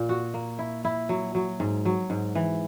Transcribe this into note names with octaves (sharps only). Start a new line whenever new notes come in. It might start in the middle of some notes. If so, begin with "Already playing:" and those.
Already playing: A#2
F#4
A#3
E4
E4
F#3
F#3
G#2
F#3
G#2
E3